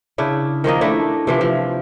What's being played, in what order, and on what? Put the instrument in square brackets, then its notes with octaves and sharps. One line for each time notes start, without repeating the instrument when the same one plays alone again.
[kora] C#3 D4 E4
D#3 F3 A#3 D#5
A3 D4 E4
C3 E3 F3
F3